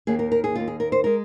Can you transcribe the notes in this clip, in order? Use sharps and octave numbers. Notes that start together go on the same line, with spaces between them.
D#2 D#3 A#3 G#4
A#4
A#4
G#4
D#2 D#3 A#3 F4
G#4
A#4
C5
G#3 A#4